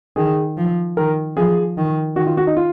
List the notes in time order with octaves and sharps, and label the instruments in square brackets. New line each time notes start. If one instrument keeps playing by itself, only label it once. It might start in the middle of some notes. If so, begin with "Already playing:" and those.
[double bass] D#3 [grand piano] G#4
[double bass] F3
[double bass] D#3 [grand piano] A#4
[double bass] F3 [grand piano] G#4
[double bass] D#3
[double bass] D#3 [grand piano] F#4
[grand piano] F4
F#4
D#4
F4